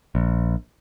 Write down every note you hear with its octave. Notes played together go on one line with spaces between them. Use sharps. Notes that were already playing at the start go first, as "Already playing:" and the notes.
A#1